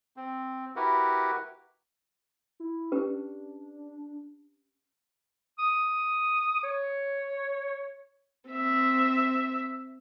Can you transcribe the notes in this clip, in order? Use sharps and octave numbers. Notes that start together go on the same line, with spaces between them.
C4
E4 F#4 G4 A#4 B4 F#5
E4
C#4 D4 G4 B4
D#6
C#5
C4 E5